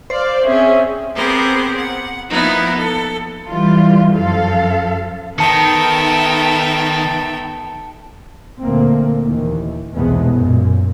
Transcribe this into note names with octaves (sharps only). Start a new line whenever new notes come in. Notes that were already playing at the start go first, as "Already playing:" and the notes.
C5 D5 F5
C4 C#4 G#4 E5
B3 C4 G4 G#4 A#4 C5
F#5
F3 A#3 B3 D#4 E4
A4
E3 G3 F4
F#2 F3 A4 F5
D#3 B3 D#4 A4 E5 G5 A5 C#7
D2 A#2 A3 A#3 C4
D#2 D#3 E3
B1 E2 C3 G#3 A3 B3
F#2 A#2